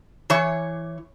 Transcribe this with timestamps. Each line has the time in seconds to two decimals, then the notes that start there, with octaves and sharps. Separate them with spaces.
0.30 E3 C#5